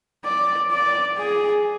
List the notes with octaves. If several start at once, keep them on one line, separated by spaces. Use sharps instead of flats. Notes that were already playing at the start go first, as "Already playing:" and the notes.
D5
D5
G#4